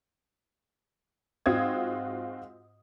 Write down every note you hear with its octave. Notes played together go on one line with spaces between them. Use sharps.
G#2 C4 F4 F#4 D#6 G#6